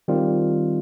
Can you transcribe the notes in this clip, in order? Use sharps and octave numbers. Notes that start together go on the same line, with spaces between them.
D#3 G3 C4 F4